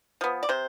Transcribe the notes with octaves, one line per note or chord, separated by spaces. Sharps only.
F3 B3
D5
C3 C5